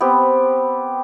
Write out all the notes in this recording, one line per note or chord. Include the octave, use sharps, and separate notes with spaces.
B3 C4 G4